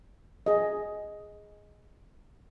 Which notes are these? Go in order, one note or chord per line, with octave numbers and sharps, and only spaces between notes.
G#4 D#5